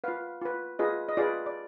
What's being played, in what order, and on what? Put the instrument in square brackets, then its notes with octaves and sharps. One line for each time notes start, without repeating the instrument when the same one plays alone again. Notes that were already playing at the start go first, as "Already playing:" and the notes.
[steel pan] F4 B4 F5
F4 B4
F4 G#4 B4 D#5
D#5
F4 G#4 B4 D5
D5